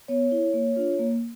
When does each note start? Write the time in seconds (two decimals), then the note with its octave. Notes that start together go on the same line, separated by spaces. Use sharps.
0.08 B3 C#5
0.32 E4
0.54 A#3
0.76 D4 F4
0.99 A#3